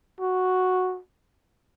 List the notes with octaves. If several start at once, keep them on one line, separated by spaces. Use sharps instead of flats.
F#4